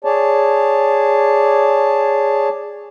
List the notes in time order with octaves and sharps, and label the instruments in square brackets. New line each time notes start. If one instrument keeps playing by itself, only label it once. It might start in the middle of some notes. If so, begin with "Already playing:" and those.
[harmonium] G#4 C#5 D5 A5